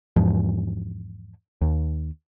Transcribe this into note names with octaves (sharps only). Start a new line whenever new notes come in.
E2 G#2 F3
D#2